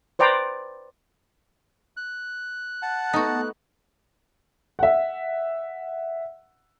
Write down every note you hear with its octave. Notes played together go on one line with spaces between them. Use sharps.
B4 C5 D5 G5 A#5
F#6
F#5 A5
A3 B3 D#4 F#4
E5 F#5